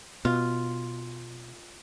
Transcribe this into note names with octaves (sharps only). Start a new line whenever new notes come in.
B2 F4